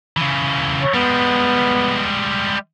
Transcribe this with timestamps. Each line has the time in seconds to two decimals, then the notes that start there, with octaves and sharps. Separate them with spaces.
0.17 C#3 E3
0.82 C#5
0.94 G3 G#3 B3